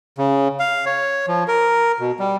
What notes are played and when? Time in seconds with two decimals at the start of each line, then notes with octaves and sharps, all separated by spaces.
0.18 C#3
0.60 F5
0.86 C#5
1.28 F3
1.48 A#4
2.00 B2
2.19 G3